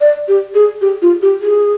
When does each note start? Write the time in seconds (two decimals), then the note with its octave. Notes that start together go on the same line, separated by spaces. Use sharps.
0.01 D5
0.28 G4
0.55 G#4
0.82 G4
1.02 F4
1.22 G4
1.41 G#4